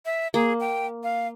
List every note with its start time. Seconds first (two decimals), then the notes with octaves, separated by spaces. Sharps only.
0.05 E5
0.34 A#3 G#4
0.60 G5
1.03 F5